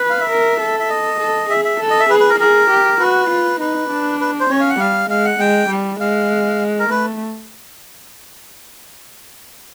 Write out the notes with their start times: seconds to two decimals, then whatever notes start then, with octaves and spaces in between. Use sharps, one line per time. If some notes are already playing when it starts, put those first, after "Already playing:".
Already playing: B4
0.10 F5
0.20 E5
0.30 A#4
0.61 A4
0.80 E5
0.90 D#5
1.20 A4
1.50 G#4 E5
1.65 E5
1.80 A4
1.90 D#5
2.00 E5
2.10 G#4 B4
2.20 B4
2.30 A#4
2.40 G#4 A#4
2.70 G4
3.00 F#4 B4
3.30 F4
3.60 D#4 B4
3.89 D4
4.20 B4
4.40 C5
4.50 C#4 C#5
4.60 F5
4.70 F#5
4.79 G3 F5
5.10 G#3 F5
5.25 F#5
5.40 G#3 G5
5.70 G3
6.00 G#3 F5
6.79 A#4
6.90 A3 B4